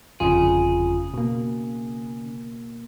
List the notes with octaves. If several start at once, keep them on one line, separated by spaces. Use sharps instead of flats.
G1 F2 C#3 F4 G#4
B2 A#3